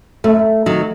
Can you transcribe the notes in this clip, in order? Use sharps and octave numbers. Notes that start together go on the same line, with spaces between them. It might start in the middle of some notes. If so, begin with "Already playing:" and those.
F#2 A3
D#3 F#3